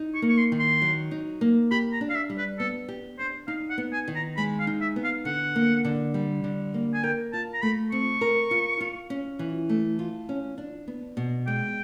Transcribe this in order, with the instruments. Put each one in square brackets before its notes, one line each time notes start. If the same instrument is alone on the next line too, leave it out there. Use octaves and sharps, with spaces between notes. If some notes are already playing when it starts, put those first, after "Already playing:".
Already playing: [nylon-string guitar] D#4
[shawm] C#6
[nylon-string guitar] A#3
[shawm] C#6
C6
[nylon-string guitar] D#3
[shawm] C6
[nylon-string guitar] F#3
D#4
A#3
[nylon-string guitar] G4 [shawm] B5
[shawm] A#5
[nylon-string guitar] D4
[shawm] F5
E5
[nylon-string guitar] G3
[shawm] B4
[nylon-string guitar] B3 [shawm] A4
[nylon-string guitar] G4
[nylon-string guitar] D4 [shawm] C5
[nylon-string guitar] D#4 [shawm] F5
[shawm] F#5
[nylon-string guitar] B3
[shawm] G#5
[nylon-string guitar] D#3
[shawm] A#5
[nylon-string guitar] G#3 [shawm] B5
[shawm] F5
[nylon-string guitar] D#4
[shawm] E5
[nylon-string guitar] B3
[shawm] F5
[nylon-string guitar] D3 [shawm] F#5
[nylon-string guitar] A#3
D3
G3
D3
A#3
[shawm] G#5
[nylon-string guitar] A#4 [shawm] G5
[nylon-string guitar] F4 [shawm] A5
[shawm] A#5
[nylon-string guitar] A3 [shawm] B5
[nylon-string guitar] C4 [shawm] C#6
[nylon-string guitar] A#4
F4
F4
C#4
E3
A3
F4
C#4
D4
B3
B2
[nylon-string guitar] G#3 [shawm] G5